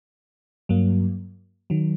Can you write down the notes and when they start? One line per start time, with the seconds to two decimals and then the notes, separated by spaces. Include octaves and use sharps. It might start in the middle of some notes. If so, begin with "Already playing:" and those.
0.69 G2 F#3 A#3
1.70 D#3 F#3